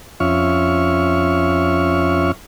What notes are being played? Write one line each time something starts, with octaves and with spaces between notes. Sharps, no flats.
F2 C#4 F4 E5 C#6 F6